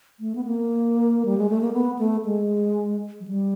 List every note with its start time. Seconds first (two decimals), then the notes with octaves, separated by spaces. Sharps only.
0.20 A3
0.35 B3
0.45 A#3
1.25 G3
1.38 G#3
1.49 A3
1.61 A#3
1.73 B3
1.99 A3
2.25 G#3
3.20 F#3
3.28 G3